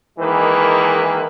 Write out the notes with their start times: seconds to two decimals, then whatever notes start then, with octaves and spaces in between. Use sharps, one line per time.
0.19 D#3 E3 G#3 A#3 G#4 B4